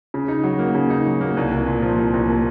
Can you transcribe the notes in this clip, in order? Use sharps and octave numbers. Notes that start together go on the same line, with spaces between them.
C#3
D#4
F#3
A#3
C#3
D#4
F#3
A#3
C2
C2
A#2
F3
C2
C2
A#2